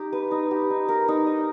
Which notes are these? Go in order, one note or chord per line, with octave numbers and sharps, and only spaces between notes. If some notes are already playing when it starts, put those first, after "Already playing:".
Already playing: D#4 G4
B4
D#4
G4
D#4
A#4
D#4
D#5